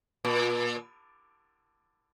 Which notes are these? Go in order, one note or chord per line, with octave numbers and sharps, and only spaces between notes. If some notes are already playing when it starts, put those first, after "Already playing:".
A#2